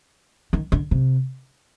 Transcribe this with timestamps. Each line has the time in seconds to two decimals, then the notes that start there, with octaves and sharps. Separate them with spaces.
0.53 D#3
0.72 D3
0.91 C3